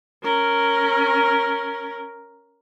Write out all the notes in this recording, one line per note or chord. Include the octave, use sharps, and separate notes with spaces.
C#4 A#4